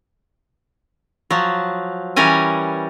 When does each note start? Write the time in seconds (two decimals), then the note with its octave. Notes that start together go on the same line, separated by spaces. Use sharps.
1.30 F3 F#3
2.16 E3 G3 C#4 A#4 G#5